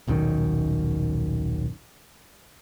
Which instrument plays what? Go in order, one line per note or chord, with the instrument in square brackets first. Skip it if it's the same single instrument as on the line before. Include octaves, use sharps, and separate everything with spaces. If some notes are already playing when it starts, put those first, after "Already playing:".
[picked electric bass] D#1 B1 F#2 D#3